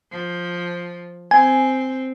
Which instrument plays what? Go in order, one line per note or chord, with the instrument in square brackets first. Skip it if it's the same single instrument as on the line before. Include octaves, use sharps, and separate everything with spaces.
[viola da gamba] F3
[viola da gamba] C4 [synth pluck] G#5